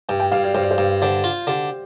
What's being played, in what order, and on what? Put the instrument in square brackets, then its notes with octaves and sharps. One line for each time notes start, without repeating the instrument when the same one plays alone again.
[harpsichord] G2 [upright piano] G5
[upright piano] G5
[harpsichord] G2 [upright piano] F5
[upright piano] D5
[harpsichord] G2 [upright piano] C5
[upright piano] D5
C5
[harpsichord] G2
[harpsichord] D3 [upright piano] C5
[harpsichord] F4
[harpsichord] D3 [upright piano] G4